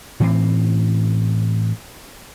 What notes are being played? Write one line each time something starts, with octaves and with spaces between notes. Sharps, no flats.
A2 E3 C4